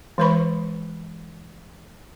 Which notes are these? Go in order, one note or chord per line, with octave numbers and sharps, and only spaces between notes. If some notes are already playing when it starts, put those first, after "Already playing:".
E3 G#3 B4 C5 B5 C#6